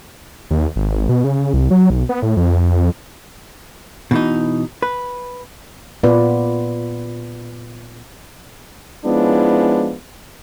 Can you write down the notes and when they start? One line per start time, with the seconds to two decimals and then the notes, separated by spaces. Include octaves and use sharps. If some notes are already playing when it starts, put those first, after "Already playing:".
0.51 D#2
0.76 G#1
1.09 B2
1.24 C#3
1.53 C2
1.71 F#3
1.90 B1
2.09 B3
2.22 A2
2.37 F2
4.11 B2 E3 D#4
4.82 B4
6.03 A#2 B3 F4 B4 D5
9.05 F3 G#3 B3 C#4 D4 E4